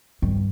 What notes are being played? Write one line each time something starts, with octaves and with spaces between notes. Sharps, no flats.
G2